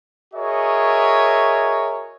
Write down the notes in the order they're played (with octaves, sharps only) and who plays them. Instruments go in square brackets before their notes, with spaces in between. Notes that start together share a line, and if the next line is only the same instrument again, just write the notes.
[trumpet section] F#4 G#4 A#4 C#5 D#5 E5